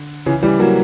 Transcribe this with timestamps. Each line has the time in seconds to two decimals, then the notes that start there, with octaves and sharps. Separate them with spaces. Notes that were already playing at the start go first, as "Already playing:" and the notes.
Already playing: D3
0.26 C#3 E3
0.42 E3 G3
0.59 F#3 A#3